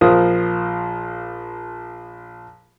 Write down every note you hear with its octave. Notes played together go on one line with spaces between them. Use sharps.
A#1 F3 F4 A#4 C5 D#6